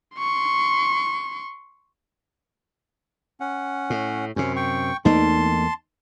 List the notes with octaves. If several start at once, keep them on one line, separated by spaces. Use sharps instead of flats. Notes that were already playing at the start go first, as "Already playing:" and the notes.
C6 C#6
C#4 F#5
A2
F#2 C3 C#4
G5 C#6
E2 A3 A#3 D#4 A5 C6